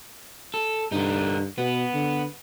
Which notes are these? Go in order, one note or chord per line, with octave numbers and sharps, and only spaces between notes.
A4
G2 D3 D#4
B2 B3
D3